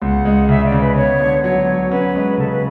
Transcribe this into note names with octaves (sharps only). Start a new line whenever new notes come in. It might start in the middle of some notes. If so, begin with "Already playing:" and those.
C#2 F#5
G#3
C#3 E5
D5
C#3
B4
B3 C#5
D3
F#3 C#5
F#3
C#4 B4
G#3
C#3 A4
B4